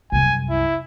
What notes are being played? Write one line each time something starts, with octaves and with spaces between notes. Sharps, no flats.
C2 F#2 G#5
E4